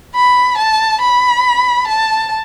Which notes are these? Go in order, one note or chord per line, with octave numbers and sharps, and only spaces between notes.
B5
A5
B5
A5